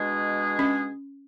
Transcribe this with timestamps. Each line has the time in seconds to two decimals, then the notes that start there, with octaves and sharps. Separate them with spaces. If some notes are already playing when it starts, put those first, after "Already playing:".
Already playing: B2 G#3 D4 G#4
0.59 C#4